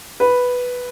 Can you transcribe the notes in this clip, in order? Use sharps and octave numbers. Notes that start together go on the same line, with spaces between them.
B4